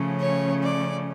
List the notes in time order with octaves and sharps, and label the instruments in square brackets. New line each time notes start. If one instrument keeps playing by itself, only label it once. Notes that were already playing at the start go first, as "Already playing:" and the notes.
Already playing: [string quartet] C#3 F3 A3 C#4
C#5
D5